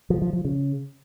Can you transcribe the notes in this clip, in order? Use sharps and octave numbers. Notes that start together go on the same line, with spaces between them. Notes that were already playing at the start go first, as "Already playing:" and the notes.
F3
F3
F3
C#3